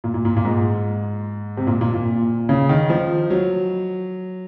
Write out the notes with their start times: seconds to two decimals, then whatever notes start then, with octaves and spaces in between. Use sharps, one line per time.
0.04 A#2
0.14 A#2
0.25 A#2
0.37 A#2
0.45 G#2
1.57 C3
1.67 A#2
1.81 A#2
1.94 A#2
2.49 C#3
2.69 D#3
2.90 F3
3.30 F#3